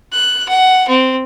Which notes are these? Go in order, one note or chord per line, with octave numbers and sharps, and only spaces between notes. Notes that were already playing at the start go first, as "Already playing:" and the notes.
F#6
F#5
C4